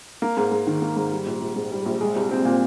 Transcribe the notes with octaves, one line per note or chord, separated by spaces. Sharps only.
A#3
G#2
G#2
D#3
A#3
G#2
G3
A#1
A#1
G#2
G3
A#1
G#3
C2
C4
A#2